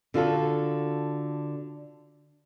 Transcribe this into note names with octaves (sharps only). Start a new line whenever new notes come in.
D3 F4 F#4 A4